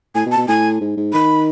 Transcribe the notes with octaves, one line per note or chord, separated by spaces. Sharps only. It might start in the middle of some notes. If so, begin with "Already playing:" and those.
A2 G#5
B2
A5
B2
A2 G#5
G#2
G#2
D#3 B5